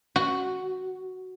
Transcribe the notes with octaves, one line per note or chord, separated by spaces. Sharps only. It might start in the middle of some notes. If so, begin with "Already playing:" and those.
F#4